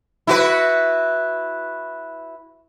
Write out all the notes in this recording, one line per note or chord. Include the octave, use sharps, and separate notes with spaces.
E4 F#4 B4